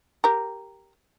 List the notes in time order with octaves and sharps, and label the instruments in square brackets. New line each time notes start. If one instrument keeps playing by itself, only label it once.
[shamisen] G4 A#4